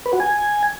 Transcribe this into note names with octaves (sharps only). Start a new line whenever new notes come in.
B4
F#4
G#5